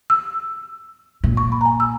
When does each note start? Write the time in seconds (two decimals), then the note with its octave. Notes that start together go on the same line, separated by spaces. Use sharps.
0.10 E6
1.24 A#2
1.37 C#6
1.52 B5
1.61 A#5
1.65 G#5
1.80 E6